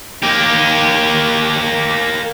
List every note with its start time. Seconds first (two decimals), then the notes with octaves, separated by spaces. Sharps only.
0.23 A#3 G4